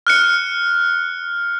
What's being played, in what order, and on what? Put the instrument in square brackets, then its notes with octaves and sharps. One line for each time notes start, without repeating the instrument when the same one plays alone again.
[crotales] F6 F#6 C#7